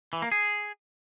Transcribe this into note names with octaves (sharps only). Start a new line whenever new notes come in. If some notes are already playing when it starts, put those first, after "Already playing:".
E3
A#3
G#4